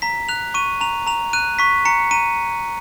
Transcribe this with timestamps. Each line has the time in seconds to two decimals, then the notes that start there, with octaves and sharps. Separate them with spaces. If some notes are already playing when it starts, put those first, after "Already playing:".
0.02 A#5 B6
0.29 F#6 F7
0.54 C#6 D#7
0.81 A#5 F7
1.07 A#5 F7
1.33 F#6 D#7
1.59 C#6 B6
1.85 A#5 C#7
2.11 A#5 D#7